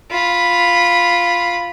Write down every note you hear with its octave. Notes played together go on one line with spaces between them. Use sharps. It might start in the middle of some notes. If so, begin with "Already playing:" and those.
F4 B5